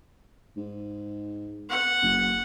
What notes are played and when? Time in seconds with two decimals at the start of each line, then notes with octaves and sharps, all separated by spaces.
0.57 G#2
1.70 F#5
2.02 F#1